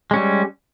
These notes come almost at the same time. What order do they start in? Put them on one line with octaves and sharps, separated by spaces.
G#3 C#4 G3